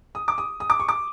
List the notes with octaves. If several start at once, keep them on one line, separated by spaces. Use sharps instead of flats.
D#6
D6
D#6
D#6
D6
C#6
D6